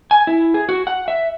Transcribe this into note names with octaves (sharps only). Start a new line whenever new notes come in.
G#5
E4
G#4
F#4
F#5
E5